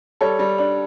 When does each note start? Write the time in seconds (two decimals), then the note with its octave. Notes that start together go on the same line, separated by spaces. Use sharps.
0.21 G3 A4 C#5
0.39 G3
0.58 D4